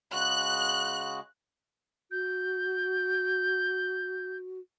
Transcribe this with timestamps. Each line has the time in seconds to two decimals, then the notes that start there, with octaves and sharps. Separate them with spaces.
0.13 C#3 G#3 F#4 F#6
2.11 F#4 G6